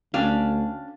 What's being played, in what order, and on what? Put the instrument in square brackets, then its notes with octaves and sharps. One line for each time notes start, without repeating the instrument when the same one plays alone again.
[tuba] D2 [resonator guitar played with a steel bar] C#4 D4 G5 [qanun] F5